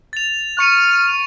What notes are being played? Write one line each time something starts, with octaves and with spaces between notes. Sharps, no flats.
A6 F7
C#6 F6 C#7 D#7